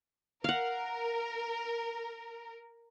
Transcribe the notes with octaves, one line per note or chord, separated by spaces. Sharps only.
A#4 F5 F#5